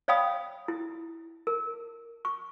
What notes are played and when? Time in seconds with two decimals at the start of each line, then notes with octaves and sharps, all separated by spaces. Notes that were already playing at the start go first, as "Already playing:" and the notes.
0.08 C#5 D5 F5 G5 B5 D#6
0.68 E4
1.47 A#4
2.25 C#6